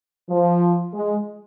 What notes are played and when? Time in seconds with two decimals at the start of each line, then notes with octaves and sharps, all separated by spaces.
0.29 F3
0.93 G#3